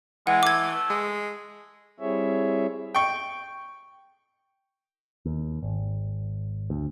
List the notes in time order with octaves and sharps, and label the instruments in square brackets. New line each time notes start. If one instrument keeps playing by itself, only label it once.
[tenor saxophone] E3 [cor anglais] G#3 [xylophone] F#5
[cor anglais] A3 [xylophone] D6 G#6
[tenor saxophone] G#3
[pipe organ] G3 C4 E4 G#4 C#5 E5
[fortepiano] G5 C#6
[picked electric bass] D#2
G#1
D2